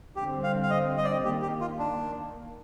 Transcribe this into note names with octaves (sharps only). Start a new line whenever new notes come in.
D3 G3 C4 G4
F5
F5
D#5
D#5
D5
D#5
D#3 A#3 G4
G4
F4
D4